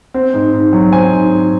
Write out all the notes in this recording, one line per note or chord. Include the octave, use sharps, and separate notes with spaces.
C4
G#2
G#2
F#3
C4 G#5
G#2
G#2